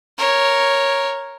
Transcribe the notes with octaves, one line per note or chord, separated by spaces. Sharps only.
A#4 C#5